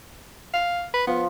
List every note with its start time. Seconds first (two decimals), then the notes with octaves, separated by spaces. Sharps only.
0.54 F5
0.94 B4
1.07 F3 B3